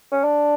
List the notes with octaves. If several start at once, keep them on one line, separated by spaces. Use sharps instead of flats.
C#4
D4